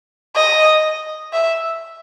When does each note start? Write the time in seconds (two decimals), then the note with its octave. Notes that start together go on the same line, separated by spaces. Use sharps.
0.35 D#5
1.33 E5